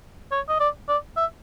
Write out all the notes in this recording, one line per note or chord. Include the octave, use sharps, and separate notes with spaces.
C#5
D#5
D5
D5
E5